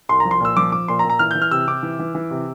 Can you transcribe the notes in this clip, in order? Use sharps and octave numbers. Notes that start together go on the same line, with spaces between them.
C2 C6
A#5
F3
C6
A#2 E6
F3 D6
F3 D6
A#2 C6
A#5
A#2
A#5
E3 F6
E3 G6
F6
C3 E6
C3 D6
E3
E3
E3
C3